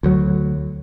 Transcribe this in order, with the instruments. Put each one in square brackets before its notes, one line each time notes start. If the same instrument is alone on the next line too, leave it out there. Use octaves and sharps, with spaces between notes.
[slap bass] D2 F#3